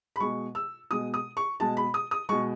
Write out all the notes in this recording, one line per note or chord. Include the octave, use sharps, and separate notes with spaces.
B5
B2 G#3 C#6
E6
B2 G#3 D#6
D#6
C#6
B2 G#3 A5
B5
D#6
D#6
B2 G#3 C#6